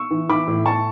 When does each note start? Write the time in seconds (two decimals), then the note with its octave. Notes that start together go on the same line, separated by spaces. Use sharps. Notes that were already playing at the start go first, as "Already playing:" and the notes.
Already playing: C#6 E6
0.11 E3
0.29 E3 B5 D6
0.47 A2
0.66 A2 A5 C#6